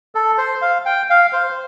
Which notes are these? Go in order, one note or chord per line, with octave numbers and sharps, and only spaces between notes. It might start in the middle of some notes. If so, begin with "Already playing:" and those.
A4
C5
F5
G5
F5
C5